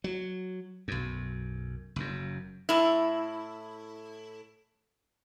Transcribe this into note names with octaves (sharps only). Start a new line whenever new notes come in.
F#3
B1 F#2
F#1 F#2
A2 E4